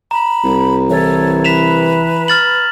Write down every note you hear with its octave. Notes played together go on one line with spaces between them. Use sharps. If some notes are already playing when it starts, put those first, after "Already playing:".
A#5 B5
C2
E3 A4 C#5
B4 B6 E7 F7
F6 A6 F#7